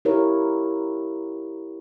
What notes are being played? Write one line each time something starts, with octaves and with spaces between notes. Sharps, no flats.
E4 G4 A#4 C#5